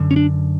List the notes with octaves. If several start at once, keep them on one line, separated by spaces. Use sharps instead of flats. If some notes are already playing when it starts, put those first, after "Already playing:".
Already playing: F#2 D3
C#4
D4